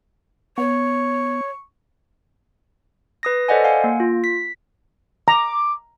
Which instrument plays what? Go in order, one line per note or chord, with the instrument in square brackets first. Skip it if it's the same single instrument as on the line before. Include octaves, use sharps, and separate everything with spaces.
[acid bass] B3 [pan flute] C#5 [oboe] C#6
[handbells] B4 D#6 A#6
A4 C5 D5 D#5 F#5 G#5
F5 F#5 G#5
A#3
F4
B6
[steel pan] A#5 [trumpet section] D6